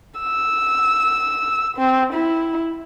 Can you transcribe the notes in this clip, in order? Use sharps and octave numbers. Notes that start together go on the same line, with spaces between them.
E6
C4
E4